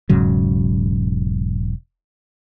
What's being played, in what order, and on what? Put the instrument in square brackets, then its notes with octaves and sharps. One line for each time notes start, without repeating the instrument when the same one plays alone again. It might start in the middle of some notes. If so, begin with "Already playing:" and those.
[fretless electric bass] E1 G#2 C#3 F#3